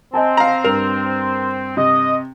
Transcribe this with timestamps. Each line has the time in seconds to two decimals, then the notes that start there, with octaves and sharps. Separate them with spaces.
0.14 C4 D#5 G#5 A5
0.37 F5 A#5
0.64 G2 A#4 F7
1.77 C3 D#5